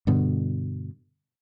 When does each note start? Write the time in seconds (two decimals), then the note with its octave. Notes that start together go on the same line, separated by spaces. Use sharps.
0.07 G2 B2 D3